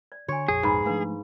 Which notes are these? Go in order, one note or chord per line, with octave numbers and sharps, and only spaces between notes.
D5
D3 F#4 C#5 G#5
A#1 F2 G#4
G#2 B4 B5
F3 A3 D4 B4 F5